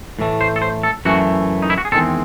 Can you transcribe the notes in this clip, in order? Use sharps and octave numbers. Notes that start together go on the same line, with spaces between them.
A2 E3 A3
C5
A4
C5
A4
F#2 E3 A3 F#4
D#4
E4
F#4
G#4
E2 D#3 G#3 C4 A4